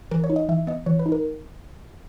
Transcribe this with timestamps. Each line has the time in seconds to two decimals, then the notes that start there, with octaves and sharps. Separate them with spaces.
0.11 E3 A#4
0.24 C#5
0.30 D#4
0.36 D#5
0.49 E3 E5
0.67 B3 D#5
0.86 E3 C#5
0.99 B4
1.06 D#4
1.12 A#4